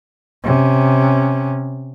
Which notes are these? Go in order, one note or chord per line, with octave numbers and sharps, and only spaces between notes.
C3 C#4